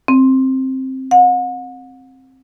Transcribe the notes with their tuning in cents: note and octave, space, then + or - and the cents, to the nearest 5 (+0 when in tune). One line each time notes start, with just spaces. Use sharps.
C4 +10
F#5 -40